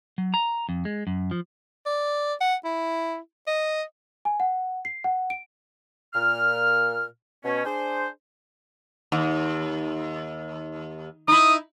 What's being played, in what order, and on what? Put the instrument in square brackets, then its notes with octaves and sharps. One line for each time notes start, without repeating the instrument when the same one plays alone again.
[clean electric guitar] F#3
A#5
F2
G#3
F#2
F3
[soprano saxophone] D5
F#5
E4
D#5
[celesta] G#5
F#5
C7
F#5
D7
[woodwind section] A#2 F6
B2 C#4
D4 G#4 C5
[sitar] D#2
[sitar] D#4 E4 [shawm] D#6